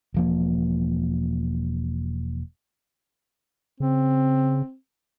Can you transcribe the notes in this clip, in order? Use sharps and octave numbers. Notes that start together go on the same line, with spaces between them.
E1 F3 A#3
C#3 C4